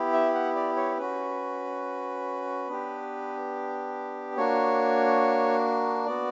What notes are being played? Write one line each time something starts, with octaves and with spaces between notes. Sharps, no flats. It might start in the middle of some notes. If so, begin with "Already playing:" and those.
Already playing: B3 E4 G4
E5
F#5
D5
C#5
C#4 F#4 B4
B3 D4 G4
A#3 D4 F#4 C#5
B3 F#4 D5